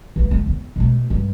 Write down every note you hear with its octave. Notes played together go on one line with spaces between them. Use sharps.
E3 A#3
D2
E2
B2 A3
G2